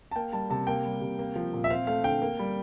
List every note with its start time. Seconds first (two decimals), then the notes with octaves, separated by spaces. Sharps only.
0.11 A5
0.16 A#3 G5
0.33 G3 A5
0.50 C3 A5
0.67 A#3 G5
0.85 G3
1.01 C3
1.19 A#3
1.36 F3
1.54 A#2
1.64 E5
1.70 C4 F5
1.87 A3 F5
2.04 D3 G5
2.22 A#3
2.39 G3